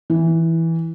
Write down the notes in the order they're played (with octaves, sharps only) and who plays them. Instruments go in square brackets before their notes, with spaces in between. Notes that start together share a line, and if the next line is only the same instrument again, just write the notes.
[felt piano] E3